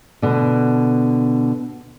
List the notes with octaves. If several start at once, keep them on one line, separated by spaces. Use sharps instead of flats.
B2 D3